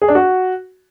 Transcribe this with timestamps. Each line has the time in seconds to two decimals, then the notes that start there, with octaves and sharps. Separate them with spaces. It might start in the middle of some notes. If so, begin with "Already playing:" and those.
0.02 G#4
0.08 D4
0.15 F#4